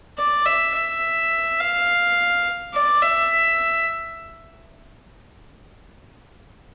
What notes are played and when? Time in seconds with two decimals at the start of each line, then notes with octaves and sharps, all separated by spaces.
0.18 D5
0.46 E5
0.75 E5
1.60 F5
2.74 D5
3.02 E5